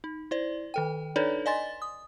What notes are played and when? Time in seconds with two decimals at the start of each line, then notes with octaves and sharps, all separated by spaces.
0.04 D#4
0.31 E4 C5 D5
0.74 D#3 A4 G5
1.16 D4 D#4 A4 B4 C#5 D5
1.46 D5 D#5 G#5 C6 A6
1.82 D#6